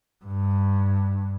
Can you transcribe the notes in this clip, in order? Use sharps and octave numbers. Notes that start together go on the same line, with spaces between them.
G2